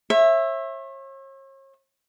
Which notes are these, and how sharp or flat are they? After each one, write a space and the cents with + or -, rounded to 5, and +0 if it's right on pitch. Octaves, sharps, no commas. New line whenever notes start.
C#5 -40 E5 +5